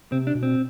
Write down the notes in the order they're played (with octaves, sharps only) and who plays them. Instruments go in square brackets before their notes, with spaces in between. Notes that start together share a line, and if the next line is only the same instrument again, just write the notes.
[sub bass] C3 [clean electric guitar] C4
[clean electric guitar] D4
[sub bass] B2
[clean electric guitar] C4